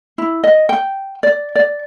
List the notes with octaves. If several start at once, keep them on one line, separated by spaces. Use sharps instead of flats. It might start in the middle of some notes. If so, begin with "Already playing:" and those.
E4
D#5
G5
D5
D5